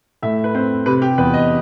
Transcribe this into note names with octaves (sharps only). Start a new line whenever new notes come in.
A2 E5
B4
C4 C5
C3 B4
G4
E2 B4
D#5